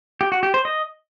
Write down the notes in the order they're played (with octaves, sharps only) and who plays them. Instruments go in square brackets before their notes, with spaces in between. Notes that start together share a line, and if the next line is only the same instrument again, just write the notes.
[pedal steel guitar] G4
F#4
G4
C5
D#5